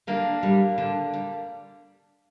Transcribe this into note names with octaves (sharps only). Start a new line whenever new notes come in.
D3 A#3 D4
G3
D3
G3